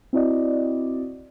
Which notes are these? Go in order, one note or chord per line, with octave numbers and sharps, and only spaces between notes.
C4 E4 F#4 D5 D#5